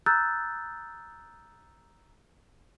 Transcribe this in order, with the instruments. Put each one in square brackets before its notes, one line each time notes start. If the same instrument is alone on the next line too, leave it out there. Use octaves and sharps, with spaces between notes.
[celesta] A#5 D#6 E6 F#6 G6 A6